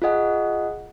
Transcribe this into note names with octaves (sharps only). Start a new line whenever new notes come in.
F4 G#4 D#5 F#5